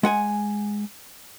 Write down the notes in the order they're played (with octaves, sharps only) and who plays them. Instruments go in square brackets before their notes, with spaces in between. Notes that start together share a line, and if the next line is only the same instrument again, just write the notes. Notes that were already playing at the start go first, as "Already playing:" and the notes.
[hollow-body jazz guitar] G#3 F#5 G#5